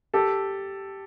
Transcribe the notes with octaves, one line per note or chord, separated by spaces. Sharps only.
G4 A4